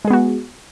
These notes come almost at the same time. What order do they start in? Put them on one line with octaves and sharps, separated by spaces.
G#3 G#4 B3 F#4